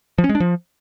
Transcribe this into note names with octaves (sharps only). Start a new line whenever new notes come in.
F3
C#4
G#3
D4
F3